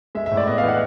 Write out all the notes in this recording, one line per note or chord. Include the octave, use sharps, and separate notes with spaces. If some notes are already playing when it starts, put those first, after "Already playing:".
G#3 E5
E5
A2
D5
B3 D#5
F5
E3
F#5